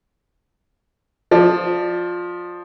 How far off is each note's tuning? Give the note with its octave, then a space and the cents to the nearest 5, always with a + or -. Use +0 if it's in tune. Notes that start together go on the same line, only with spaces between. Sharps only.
F3 +15 D5 +30